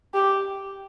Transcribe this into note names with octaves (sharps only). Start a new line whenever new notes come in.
G4